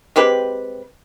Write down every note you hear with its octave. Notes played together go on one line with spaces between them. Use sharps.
G#3 C4 G4 B4